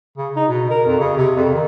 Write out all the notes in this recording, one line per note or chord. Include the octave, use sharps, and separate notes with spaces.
C#3
D#4
B2
A#4
F2
C#3
C3
F2
D#3